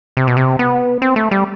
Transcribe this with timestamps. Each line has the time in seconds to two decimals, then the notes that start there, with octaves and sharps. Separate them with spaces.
0.17 C3
0.27 B2
0.37 C3
0.59 B3
1.02 C4
1.16 A3
1.31 G3